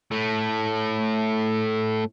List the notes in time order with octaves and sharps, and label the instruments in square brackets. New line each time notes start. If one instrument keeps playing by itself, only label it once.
[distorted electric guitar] A2 A3